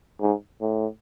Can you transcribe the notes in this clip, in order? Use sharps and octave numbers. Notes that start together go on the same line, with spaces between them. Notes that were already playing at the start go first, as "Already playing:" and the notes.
G#2
A2